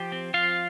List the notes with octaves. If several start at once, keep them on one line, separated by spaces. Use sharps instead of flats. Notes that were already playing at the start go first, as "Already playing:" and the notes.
Already playing: F3 G4
C4
F3 F4 F5